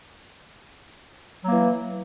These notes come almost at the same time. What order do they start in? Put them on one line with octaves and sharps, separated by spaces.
F#3 A#3 E3